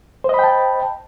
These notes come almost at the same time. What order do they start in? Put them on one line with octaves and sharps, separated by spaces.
C5 D#5 B5 G5 A5